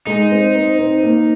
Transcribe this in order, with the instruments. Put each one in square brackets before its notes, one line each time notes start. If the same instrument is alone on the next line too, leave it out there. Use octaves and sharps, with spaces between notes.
[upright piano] G#3 [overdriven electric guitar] D#4
[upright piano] C4
C4
C4
A#3